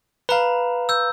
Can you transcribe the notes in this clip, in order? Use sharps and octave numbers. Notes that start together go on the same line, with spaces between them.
B4 F5 A#5 B5
E6 G6